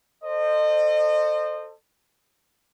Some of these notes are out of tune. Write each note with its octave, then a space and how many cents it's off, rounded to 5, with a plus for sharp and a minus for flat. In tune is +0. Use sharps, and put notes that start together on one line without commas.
A4 +20 C5 +0 D#5 -30